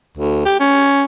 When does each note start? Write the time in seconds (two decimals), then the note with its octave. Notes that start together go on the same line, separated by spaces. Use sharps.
0.17 D2
0.45 G4
0.60 C#4